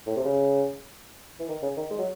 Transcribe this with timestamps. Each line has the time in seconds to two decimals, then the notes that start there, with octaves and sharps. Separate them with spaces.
0.06 A2
0.16 C3
0.25 C#3
1.39 E3
1.49 D#3
1.62 C#3
1.77 D#3
1.90 G#3
1.98 F#3